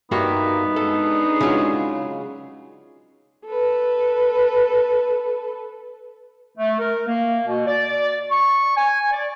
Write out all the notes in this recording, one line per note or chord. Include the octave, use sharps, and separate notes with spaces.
G2 A#3 B3 D#4 F#4 D5 E5
G#3 D4 G#4 A4
C#3 F#3 F4
A4 B4
A3
A#4
A#3
B2
D5
C#6
G#5
D5